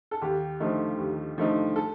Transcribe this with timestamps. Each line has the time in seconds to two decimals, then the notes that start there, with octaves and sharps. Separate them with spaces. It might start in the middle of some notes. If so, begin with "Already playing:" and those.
0.11 A4
0.22 D#2 G4
0.60 D3 F3 A3 D#4
0.98 D#2
1.38 D3 F3 A3 D#4
1.76 A4